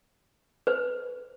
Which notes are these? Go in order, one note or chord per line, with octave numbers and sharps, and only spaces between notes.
B4 C5